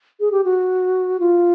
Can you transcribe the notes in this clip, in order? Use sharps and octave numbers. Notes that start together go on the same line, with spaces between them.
G#4
G4
F#4
F4